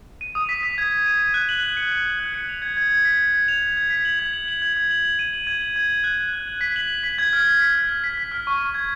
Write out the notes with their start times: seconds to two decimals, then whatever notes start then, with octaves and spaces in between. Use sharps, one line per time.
0.21 D#7
0.35 D#6
0.49 B6
0.63 B6
0.78 G#6
0.91 G#6
1.06 D#7
1.20 D#7
1.34 F#6
1.49 F#7
1.63 F#6
1.77 C#7
1.92 C#7
2.06 F#7
2.20 F#6
2.34 C#7
2.49 F7
2.62 G#6
2.77 G#6
2.91 G#6
3.05 B6
3.19 G#6
3.34 G#6
3.48 F7
3.62 G#6
3.77 G#6
3.90 B6
4.05 F#7
4.19 G#6
4.33 F#7
4.48 F#7
4.62 G#6
4.77 G#6
4.91 F#7
5.05 F#7
5.19 D#7
5.33 F#7
5.47 G#6
5.62 F#7
5.76 G#6
5.90 F#7
6.04 F#6
6.18 F#7
6.33 F#6
6.48 F#7
6.61 B6
6.76 F#7
6.90 F#7
7.03 B6
7.18 G#6
7.33 F6
7.47 G#6
7.61 B6
7.75 F6
7.89 G#6
8.04 B6
8.17 B6
8.32 F6
8.47 C#6
8.60 F6
8.74 G#6